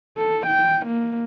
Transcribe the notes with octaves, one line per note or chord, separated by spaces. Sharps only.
A4
G5
A#3